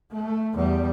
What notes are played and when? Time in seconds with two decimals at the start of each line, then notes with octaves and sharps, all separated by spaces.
0.11 A3
0.55 E2 G3